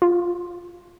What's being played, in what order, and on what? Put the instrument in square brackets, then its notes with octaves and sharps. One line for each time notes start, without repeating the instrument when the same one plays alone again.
[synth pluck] F4